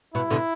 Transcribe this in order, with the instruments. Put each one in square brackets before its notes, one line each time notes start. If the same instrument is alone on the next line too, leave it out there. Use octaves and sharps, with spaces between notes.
[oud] B2 [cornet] E4
[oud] B2 D3